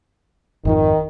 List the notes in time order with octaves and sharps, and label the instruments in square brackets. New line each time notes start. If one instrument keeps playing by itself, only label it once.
[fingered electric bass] G#1 F2 F3 [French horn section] D#3